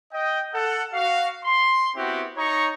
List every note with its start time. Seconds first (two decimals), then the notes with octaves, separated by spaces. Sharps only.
0.13 D#5 G5
0.53 A4 F#5
0.93 F#4 F5
1.44 C6
1.96 B3 C4 E4 F#4 G4
2.37 D#4 C#5 A#5 C#6